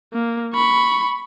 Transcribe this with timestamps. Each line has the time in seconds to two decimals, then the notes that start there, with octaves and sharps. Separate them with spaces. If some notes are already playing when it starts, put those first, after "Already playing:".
0.13 A#3
0.54 B5 C#6